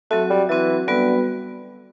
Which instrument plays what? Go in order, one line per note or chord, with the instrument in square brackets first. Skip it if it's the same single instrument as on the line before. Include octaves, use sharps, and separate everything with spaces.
[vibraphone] F#3 C4 F#4 [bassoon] A3
[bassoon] G3
[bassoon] E3 [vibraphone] F#3 C4 F#4
[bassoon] D3 [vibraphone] G3 B3 F#4 B4